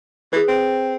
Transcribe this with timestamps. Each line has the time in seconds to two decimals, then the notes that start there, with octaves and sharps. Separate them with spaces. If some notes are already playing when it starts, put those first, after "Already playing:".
0.33 E3 G#4 B4
0.48 C4